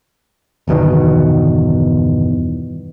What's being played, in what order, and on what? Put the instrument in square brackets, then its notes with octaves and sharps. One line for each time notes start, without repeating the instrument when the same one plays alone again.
[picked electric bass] G1 E2 B2 D#3